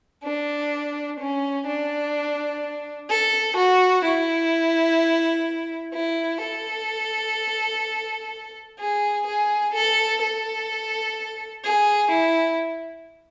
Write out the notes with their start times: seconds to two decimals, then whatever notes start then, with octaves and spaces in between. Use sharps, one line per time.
0.24 D4
1.20 C#4
1.66 D4
3.10 A4
3.57 F#4
4.05 E4
5.94 E4
6.41 A4
8.79 G#4
9.27 G#4
9.74 A4
10.22 A4
11.64 G#4
12.11 E4